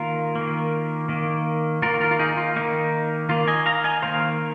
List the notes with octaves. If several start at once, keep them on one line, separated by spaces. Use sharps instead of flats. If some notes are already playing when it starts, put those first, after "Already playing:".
Already playing: D#3 A#3 F4 A#4
D#3 A#3
D#3 A#3
D#3 A#3 F4 A#4
F4 A#4
F4
D#4 G#4
F4
D#3 A#3 D#4
D#3 A#3 F4
D#5 G#5
F5 A#5
D#5 G#5
D#3 A#3 C5 F5